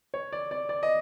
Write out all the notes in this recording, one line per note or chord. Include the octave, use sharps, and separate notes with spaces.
C#5
D5
D5
D5
D#5